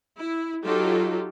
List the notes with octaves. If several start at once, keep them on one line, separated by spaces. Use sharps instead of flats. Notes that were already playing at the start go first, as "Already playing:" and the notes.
E4
F#3 D#4 F4 G4 A4